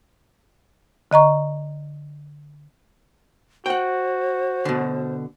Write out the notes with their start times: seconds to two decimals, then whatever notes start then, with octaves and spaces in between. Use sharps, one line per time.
1.11 D3 D#5 A#5 C#6
3.66 F#4 C5 F#5 G5
4.65 B2 D3